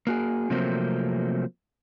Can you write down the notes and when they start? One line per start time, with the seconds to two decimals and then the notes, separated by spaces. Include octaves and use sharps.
0.07 A#3 F#4 G#4
0.50 C3 F3 F#3 A3 A#3 C4